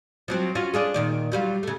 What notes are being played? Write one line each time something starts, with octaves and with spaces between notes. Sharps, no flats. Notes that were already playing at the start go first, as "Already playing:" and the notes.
F3 F#3 C4
C#4 F4 F#4
D4 F4 G#4
A#2 D#3 D5
F#3 G3 F4
C#3 A3